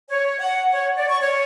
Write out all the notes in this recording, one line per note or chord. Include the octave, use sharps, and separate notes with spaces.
C#5
F#5
C#5
D5
C#6
C#5